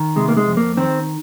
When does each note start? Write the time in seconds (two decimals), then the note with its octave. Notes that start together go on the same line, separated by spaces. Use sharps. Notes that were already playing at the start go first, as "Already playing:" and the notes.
Already playing: D#3
0.16 C3 G#3
0.29 A#3
0.37 G#3
0.47 F2
0.57 A#3
0.77 D#3 C4